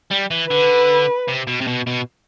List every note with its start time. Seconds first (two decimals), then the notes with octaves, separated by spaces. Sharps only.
0.11 G3
0.31 E3
0.50 D3 B4
1.28 C3
1.48 B2
1.61 C3
1.67 B2
1.87 B2